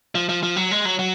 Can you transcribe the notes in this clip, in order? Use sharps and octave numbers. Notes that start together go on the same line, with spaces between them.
F3
F3
F3
F#3
G#3
F#3
F#3